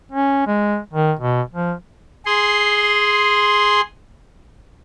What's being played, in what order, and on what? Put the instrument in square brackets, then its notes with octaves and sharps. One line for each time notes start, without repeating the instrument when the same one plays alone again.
[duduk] C#4
G#3
D#3
B2
F3
[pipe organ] G#4 C6